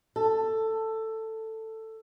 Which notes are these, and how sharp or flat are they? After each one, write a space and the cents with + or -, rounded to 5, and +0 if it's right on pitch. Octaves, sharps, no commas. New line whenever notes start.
A4 +10